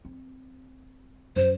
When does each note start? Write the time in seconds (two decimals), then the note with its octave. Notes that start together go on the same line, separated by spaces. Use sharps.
0.05 C4
1.36 F#2 C5